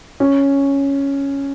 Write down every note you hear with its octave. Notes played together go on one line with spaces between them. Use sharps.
C#4